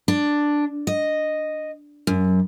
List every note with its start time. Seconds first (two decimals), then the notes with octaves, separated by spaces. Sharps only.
0.08 D4
0.87 D#5
2.07 F#2